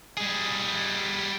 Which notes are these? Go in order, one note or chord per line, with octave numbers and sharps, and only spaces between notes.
G3 G#4